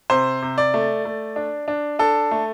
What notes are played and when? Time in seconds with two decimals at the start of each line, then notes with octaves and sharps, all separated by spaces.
0.10 C3 C5
0.42 C3
0.58 D5
0.74 A3
1.05 A3
1.36 D4
1.68 D4
1.99 D4 A4
2.31 A3